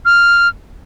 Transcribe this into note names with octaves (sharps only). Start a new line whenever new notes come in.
F6